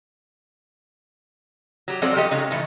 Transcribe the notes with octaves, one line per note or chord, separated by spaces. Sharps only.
F#3 G4
F3 F#3 G#3 C4 A4 D5
G2 F3 G4 A4 D#5
C#3 G#3 D#4
A2 D#3 E3 A3